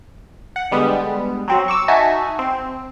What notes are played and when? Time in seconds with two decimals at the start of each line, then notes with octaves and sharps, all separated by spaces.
0.56 F#5
0.71 D3 G3 G#3 B3
1.48 F#3 C4 F#4
1.68 C#6 D6 E6
1.88 D#4 F#4 E5 G#5 A5
2.39 C4